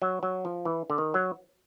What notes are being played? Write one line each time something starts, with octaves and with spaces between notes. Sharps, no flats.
F#3
F#3
F3
E3
D3
D#3
F#3